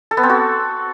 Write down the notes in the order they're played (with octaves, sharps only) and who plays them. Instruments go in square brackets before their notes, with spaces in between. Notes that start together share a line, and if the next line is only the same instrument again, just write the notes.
[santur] A4
B3
C4
F#4